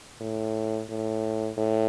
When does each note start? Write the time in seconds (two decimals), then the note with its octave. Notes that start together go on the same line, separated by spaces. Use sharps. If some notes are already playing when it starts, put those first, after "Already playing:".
0.21 A2
0.89 A2
1.58 A2